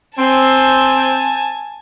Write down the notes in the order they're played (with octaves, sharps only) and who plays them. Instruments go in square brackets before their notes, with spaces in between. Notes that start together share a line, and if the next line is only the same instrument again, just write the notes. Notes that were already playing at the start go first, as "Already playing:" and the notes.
[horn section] C4 [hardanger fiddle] G#5 A5